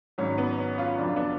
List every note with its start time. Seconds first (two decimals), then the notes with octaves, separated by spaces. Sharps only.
0.18 G#1 G#2 F#3 C#4
0.38 B3
0.58 C#4
0.78 C#4 F4
0.98 F1 F2 D3 F#3 D4
1.08 F4
1.16 B3 D4